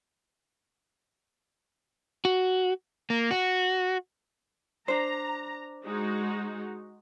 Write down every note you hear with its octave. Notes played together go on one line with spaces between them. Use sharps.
F#4
A#3
F#4
D4 C5 A#5
G#3 D#4 F#4